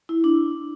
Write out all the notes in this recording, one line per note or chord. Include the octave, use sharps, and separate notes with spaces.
E4
D4